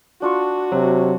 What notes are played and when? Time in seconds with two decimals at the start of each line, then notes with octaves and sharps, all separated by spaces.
0.22 D4 F4 F#4 C#6
0.72 C3 F#3